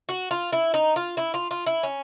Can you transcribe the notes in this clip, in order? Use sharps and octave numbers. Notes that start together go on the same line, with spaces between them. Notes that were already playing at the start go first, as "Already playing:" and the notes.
F#4
F4
E4
D#4
F4
E4
F4
F4
E4
C#4